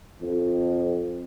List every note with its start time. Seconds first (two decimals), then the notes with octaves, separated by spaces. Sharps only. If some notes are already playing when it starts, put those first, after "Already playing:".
0.21 F2